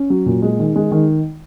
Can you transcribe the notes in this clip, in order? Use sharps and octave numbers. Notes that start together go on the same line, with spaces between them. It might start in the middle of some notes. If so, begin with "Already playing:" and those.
Already playing: C#4
F#3
A#2
G#3
D#3
G#3
D#3